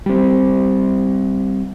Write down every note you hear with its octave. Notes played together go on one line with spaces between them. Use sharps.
G3 C4